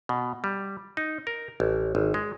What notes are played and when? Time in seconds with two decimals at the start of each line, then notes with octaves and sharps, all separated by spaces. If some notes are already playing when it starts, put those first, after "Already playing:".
0.09 B2
0.44 G3
0.97 D#4
1.27 A#4
1.60 A1
1.95 G#1
2.14 G#3